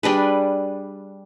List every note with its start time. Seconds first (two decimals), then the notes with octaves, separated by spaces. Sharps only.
0.03 G3 D4 G#4 B4